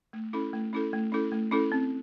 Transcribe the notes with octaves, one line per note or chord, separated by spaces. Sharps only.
A3
C#4 E4 A4
A3
C#4 E4 A4
A3
C#4 E4 A4
A3
C#4 E4 A4
C4